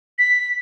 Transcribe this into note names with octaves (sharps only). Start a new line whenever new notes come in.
B6